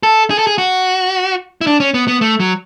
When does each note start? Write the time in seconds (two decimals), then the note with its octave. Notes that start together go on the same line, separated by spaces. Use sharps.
0.03 A4
0.30 G#4
0.39 A4
0.47 G#4
0.58 F#4
1.61 E4
1.67 D4
1.80 C#4
1.94 B3
2.08 B3
2.21 A3
2.40 F#3